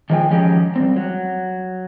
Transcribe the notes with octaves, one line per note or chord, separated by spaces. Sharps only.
D#3 F3 G#3 D5 G5 G#5
F3 G#3 C#4 D#4 G4
G3 C4
F#3